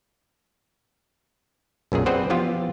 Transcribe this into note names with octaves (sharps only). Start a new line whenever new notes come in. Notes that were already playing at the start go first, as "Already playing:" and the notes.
B1 F#2 A#2 G#4
C4 G#4 B4 C5 D5 F#5
E3 F3 B3 F4 G4